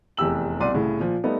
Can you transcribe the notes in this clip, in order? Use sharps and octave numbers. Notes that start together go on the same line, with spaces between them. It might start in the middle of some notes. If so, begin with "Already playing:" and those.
F1 E2 G4 E6 F#7
C2 B2 D5 C6 D#7
C2 A2 C#3
A#2 F3
G3 A3 B3 D#4